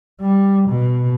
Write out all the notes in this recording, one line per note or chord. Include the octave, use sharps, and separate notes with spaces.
G3
B2